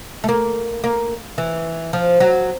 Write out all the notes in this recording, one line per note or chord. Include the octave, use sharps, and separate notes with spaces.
A3
A#3
A#3
E3
F3
F#3